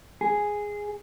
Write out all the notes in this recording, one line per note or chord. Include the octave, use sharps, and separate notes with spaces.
G#4